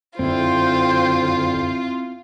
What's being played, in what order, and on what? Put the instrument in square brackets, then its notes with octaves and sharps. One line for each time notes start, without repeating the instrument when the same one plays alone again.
[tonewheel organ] F#2 D3 [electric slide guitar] C4 E4 [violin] F4 [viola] C5 G5